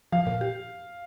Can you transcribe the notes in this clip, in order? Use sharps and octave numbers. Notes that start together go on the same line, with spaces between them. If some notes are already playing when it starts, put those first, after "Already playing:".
F3 F5
A#2
G4